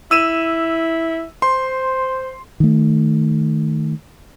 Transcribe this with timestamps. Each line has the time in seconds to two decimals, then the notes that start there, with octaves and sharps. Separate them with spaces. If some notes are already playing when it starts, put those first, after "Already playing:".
0.11 E4 E6 D#7 E7
1.42 C5 C6
2.60 D#3 A3